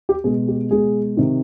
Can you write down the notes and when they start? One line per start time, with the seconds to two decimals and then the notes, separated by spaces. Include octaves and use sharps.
0.09 G4
0.24 B2 G#3 G#4
0.48 G4
0.71 B2 G#3 G#4
1.17 C3 D#3